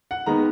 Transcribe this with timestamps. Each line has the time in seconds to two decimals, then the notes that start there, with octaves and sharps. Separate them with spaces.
0.11 F#5
0.26 D#3 G#3 B3 A#5